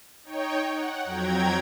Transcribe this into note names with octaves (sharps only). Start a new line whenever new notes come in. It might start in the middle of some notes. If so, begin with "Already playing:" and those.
D#4 C#5 G5
F#5
F2 F#3 G5 A#5 G#6